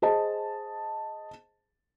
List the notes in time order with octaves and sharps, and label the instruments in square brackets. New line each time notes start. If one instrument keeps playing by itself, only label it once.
[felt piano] G#4 C5 D#5 A5